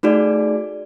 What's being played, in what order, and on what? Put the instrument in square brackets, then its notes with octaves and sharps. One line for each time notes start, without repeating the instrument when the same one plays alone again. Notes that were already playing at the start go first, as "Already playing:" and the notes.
[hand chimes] A3 D#4 F#4 G#4 D5